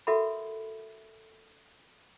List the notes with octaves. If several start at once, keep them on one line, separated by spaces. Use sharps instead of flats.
F#4 A4 A#4 E5 F#5 B5